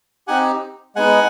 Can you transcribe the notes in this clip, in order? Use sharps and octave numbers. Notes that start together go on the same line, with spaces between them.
C4 D#4 G4 F#5 G#5
G#3 B3 D#4 F#5 G#5